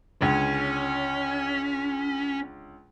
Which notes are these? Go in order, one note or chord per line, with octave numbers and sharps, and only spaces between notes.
C#2 D3 C#4